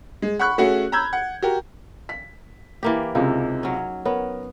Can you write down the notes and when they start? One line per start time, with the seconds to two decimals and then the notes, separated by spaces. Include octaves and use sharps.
0.22 G#3
0.39 F#5 B5 C#6 F#6
0.58 A3 C#4 F#4 G#4 F#5
0.92 A#5 B5 E6 G6 G#6
1.13 F#5
1.42 F#4 G4 A#4
2.09 B6
2.83 E3 A#3 G4
3.15 C#2 C3 D#4
3.63 F#3 C#4
4.05 B3 A#4 C#5